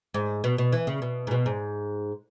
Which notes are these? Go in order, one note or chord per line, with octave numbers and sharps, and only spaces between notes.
G#2
B2
B2
E3
C#3
B2
G#2
B2
G#2